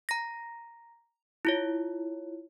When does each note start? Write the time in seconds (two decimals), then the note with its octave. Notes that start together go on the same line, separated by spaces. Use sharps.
0.09 A#5 A#6
1.45 E4 F4 C#5